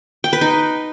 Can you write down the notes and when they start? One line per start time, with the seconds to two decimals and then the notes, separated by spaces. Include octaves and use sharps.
0.24 G5
0.33 B4
0.41 D#4